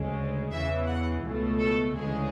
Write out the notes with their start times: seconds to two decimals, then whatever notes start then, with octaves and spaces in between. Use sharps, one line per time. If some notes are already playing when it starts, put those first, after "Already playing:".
Already playing: D2 C#3 G#3
0.51 E2 C#3 E3 E5
0.87 F#5
1.23 C#2 B2 A3
1.59 A4
1.95 D2 C#3 E3 G#3 G#4